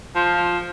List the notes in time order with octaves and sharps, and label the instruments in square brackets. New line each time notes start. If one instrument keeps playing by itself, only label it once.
[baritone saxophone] F3